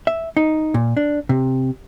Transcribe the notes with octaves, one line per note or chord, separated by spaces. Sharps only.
E5
D#4
A#2
D4
C3